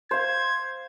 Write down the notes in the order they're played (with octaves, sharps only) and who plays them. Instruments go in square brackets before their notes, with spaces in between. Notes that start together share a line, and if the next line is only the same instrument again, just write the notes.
[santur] C5 F5 [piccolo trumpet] G#6